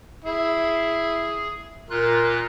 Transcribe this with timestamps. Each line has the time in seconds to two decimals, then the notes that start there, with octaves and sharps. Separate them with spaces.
0.24 E4 G#4
1.90 A#2 F4 A#4 F#6